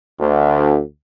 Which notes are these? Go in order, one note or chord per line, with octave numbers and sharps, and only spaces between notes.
D2